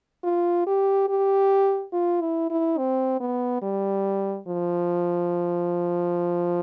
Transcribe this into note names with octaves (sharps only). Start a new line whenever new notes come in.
F4
G4
G4
F4
E4
E4
C4
B3
G3
F3